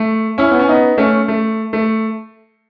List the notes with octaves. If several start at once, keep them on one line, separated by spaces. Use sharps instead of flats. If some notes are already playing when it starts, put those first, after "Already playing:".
Already playing: A3
C#4 E4
B3
C#4
B3 D#4
A3 C#4
A3
A3